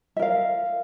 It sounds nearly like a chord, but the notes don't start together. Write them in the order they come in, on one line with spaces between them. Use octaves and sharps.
E5 A#4 F5